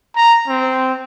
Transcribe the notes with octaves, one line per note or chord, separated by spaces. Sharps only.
A#5
C4